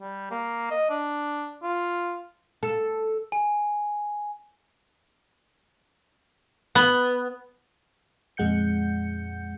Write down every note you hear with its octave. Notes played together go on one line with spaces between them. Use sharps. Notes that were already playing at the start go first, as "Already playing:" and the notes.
G3
A#3
D#5
D4
F4
A4
G#5
B3
F2 A#2 G#3 F#5 G6 C#7